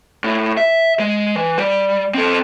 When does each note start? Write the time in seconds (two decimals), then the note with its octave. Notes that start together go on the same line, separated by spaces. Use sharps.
0.24 A2
0.57 E5
1.00 G#3
1.36 E3
1.58 G3
2.15 C4 A4